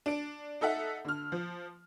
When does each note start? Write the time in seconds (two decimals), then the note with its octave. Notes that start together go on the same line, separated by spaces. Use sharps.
0.06 D4 D7
0.61 D#4 A4 E5 F#5
1.05 D3 F6
1.32 F3